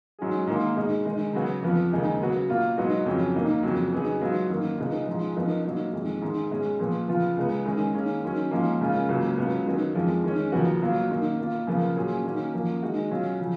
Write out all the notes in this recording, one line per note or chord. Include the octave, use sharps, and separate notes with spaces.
G#2 F#3 C#4 G#4
G#2 D#3 A#3
B2 G#3 D#4 G#4
D#3 G#3 D#4
C#3 F#3 B3 F#4
F2 F3 B3
D#2 C#3 G#3 D#4 G#4
C#3 F#3 B3 F#4
B2 A#3 F4
G#2 F#3 B3 D#4 F#4
F2 C#3 F#3 C#4
D#2 D#3 A#3 D#4
F2 C#3 F#3
C#3 F#3 B3 D#4 G#4
G#2 F#3 B3 F4
F#2 D#3 F#3 A#3
C#2 B2 G#3 B3 D#4
G#2 F3 G#3
F#2 F3 B3 D#4
B2 F#3 A#3 D#4
F2 D#3 G#3
G#2 D#3 G#3
B2 G#3 C#4 G#4
A#2 F3 B3
C#3 F3 B3 F4
C#2 C#3 G#3 B3
F#2 D#3 G#3 C#4 G#4
D#3 A#3 C#4 G#4
F#2 D#3 F#3 C#4
G#2 F3 A#3 C#4
F#2 C#3 G#3 C#4 F4
C#2 C#3 F#3 A#3
C#2 C#3 F#3 B3
F#2 D#3 F#3 B3
F2 F3 G#3
D#3 G#3 C#4
D#2 C#3 F3 B3 F#4
B2 F#3 A#3 F4
F#2 D#3 A#3
B2 A#3 F4
F#2 C#3 F3 B3 F4
A#2 F#3 C#4 G#4
D#3 A#3 C#4 F#4
F#2 F3 A#3
D#3 G#3 D#4 F#4
B2 F#3 C#4 F4
C#3 F3